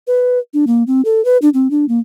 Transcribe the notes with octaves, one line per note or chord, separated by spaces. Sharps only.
B4
D4
A#3
C4
A4
B4
D4
C4
D4
A#3